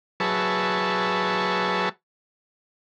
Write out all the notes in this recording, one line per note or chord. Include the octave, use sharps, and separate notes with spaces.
F#3 G#4 B4 E5 A5 C#6